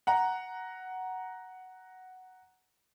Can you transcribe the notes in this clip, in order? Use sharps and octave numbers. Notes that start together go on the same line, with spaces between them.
F#5 A#5